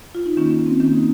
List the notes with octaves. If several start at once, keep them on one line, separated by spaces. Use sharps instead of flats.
F4
D#4
D#3 A#3 C#4
C#4
C4
D#3 A#3 C#4
D#4